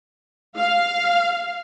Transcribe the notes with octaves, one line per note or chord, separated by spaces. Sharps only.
F5